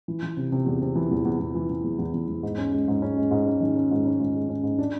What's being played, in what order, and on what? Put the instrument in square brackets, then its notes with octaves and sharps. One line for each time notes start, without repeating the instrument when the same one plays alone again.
[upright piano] E3
E3
C3
C3
E2
C3
E3
E2
E2
E2
E3
E3
E2
E2
E2
E2
G#2
C#4
G#3
G#2
C#4
G#3
G#2
C#4
D#3
C#4
G#2
C#4
G#2
G#3
C#4
G#2
D4